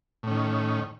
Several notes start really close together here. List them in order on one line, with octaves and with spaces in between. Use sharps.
A2 C#4 D#3